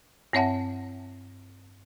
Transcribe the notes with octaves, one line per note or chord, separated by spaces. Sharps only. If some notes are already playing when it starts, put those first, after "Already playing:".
G2 C4 C#5 E5 F#5 A5